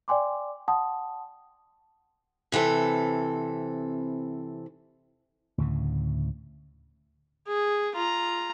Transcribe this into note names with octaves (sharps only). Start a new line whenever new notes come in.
D5 G5 G#5 C6 D6
F#5 G5 A5 C6 D#6
C3 E3 C4 A4
D2 A2 C#3
G#4
F4 A#5